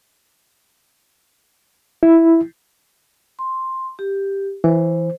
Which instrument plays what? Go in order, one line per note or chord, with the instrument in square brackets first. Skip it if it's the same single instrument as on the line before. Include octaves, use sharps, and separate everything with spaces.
[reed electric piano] E4
[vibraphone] C6
G4
[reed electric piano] E3 [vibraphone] C5